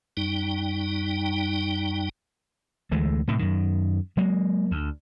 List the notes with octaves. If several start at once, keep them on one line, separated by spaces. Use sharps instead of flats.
F#2 G3 D#4 G5
D2 E3 G#3 A3
A2 C3 D#3
F#2 D#3
F#3 G#3 A#3
D2